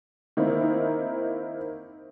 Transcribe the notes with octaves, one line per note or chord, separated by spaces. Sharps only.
D#3 A#3 C4 D#4 E4